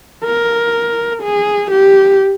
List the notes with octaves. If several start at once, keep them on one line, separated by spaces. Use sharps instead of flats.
A#4
G#4
G4